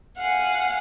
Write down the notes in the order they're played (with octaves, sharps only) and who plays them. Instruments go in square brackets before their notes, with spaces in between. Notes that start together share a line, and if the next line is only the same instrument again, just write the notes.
[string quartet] F5 F#5 G#5